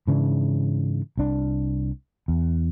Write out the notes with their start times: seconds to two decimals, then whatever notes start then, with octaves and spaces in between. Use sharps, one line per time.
0.07 G#2 C#3 E3 D4
1.18 C2 D4
2.28 E2